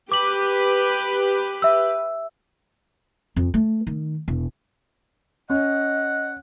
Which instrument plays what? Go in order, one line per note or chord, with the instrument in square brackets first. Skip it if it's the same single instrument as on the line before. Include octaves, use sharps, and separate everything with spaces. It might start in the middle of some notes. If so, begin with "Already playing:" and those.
[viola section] G4 B4 [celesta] D6 F#7
[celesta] E5 E6
[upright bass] F2
A3
D#3
E1
[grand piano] C#4 [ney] D#5 [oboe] F#5